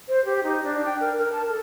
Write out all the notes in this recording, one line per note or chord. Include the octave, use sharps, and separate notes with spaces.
C5
G4
D#4
D4
G5
A#4
A#4
A5
A4